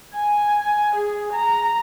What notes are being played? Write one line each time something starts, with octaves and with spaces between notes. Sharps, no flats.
G#5
G#5
G#4
A#5